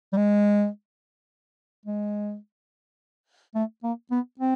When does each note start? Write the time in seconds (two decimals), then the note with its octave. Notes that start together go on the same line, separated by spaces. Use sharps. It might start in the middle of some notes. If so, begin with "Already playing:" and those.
0.13 G3
0.16 G#3
1.86 G#3
3.55 A3
3.83 A#3
4.11 B3
4.39 C4